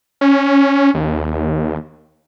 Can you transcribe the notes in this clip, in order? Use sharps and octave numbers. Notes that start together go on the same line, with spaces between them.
C#4
D#2